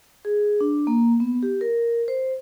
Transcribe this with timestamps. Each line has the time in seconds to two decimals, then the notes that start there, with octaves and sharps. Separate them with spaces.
0.25 G#4
0.61 D4
0.87 A#3
1.20 B3
1.43 G4
1.61 A#4
2.08 C5